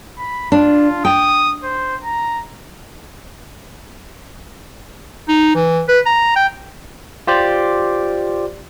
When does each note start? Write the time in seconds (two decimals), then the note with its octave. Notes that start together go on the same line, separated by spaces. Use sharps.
0.19 B5
0.52 D4 F4
1.05 G5 D#6
1.63 C5
2.04 A#5
5.28 D#4
5.55 E3
5.88 B4
6.06 A#5
6.36 G5
7.27 F4 G4 C5 D5